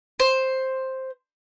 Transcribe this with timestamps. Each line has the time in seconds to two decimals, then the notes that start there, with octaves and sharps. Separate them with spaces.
0.20 C5